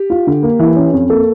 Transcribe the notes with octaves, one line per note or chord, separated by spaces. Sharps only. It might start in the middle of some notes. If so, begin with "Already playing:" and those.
Already playing: G4
F4
D3
A#3
E3
C#4
F2
A#3 A4